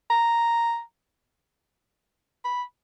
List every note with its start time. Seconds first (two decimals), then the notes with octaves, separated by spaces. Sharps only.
0.10 A#5
2.45 B5